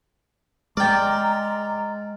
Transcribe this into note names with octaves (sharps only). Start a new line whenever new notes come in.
G#3 D5 G5 A#5 F6 A6